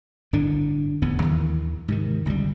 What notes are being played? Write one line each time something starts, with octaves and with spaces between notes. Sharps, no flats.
G1 A2 D3 D4
D1 E2 A2 B3
D#2 D#3 E3
G#2 C3 D#3
G1 C#2 F#2 G3